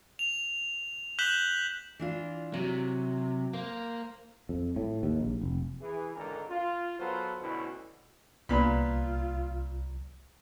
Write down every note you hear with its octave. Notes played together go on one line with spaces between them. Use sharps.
F7
F#6 G6 B6 E7 F#7 G7
E3 D4 F4
C3 F#3
A#3 C5
F2
A2
D#2
A#1
F1
E3 G#4
G#1 C#2 D3 A#4
F4
F#3 B3 F4 A4 A#4 C5
D2 B2 C#4 E4
C2 A#2 B3 F4 B5